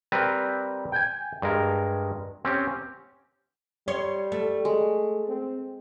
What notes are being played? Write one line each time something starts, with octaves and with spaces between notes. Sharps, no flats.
G3 C4 A#4 B4
G5 G#5
G2 G#3 A#4
C4 C#4 G4
G3 C#5 C6
A3
G#3
C4